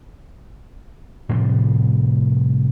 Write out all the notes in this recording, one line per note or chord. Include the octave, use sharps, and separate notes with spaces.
A2 C3 F3 G3